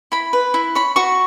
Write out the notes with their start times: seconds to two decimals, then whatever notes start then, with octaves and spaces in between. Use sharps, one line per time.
0.12 E4 B5
0.33 B4
0.54 E4
0.75 C#5 B5
0.96 F#4 C#6